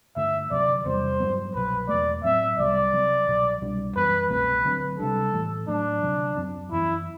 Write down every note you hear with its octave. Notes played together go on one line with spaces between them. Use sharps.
G2 D3 A3 E5
D2 C3 F#3 D5
E2 C3 G3 B3 C5
G2 F#3 B3
C2 B2 F#3 B4
E2 B2 A3 D5
A2 F#3 C4 E5
C2 C3 G3 B3 D5
C3 F#3 C4
C2 B2 F#3
C2 B2 G3 D4
F#2 E3 G3 B3 B4
C2 B2 A3 C4 B4
D2 D3 F#3 C4
C3 G3 D4 A4
A2 E3 A3
A2 F#3 A3 D4
D2 C3 F#3
F#2 F#3 C4
F#2 E3 B3 E4